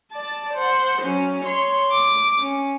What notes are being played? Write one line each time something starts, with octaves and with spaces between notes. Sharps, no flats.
D5 A5
C5 F#5
F#3 C#4
C#5 C6
D6
C#4